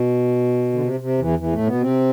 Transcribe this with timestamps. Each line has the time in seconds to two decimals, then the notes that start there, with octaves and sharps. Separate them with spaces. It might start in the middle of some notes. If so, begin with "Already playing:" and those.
Already playing: B2
0.72 D3
0.81 C3
1.00 C3
1.19 E2 E3
1.39 E2 E3
1.53 A2 A3
1.66 B2 B3
1.81 C3 C4